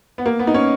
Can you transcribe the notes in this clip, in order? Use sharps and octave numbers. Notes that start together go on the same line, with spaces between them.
B3
A#3
B3
D#4
C#4